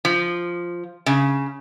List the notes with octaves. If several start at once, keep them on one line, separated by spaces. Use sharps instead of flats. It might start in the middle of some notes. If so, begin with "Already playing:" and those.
F3
C#3